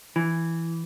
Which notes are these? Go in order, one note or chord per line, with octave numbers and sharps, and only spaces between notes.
E3